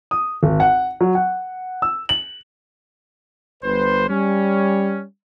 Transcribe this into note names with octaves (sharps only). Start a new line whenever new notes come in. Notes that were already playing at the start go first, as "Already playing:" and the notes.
D#6
G#1
F#5
F#3
F#5
E6
F#7
G1 B4 C5
G3 C#4